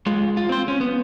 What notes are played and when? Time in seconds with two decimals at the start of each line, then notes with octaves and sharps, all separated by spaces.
0.06 G#3 F4
0.37 F4
0.49 C4 C5
0.68 C#4
0.81 B3